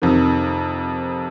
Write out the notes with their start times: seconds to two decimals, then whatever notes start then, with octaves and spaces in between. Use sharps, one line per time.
0.02 F2 C3 D#3